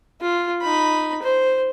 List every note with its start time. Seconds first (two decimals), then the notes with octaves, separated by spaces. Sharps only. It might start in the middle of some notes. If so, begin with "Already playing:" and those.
0.21 F4
0.62 D#4 B5
1.22 C5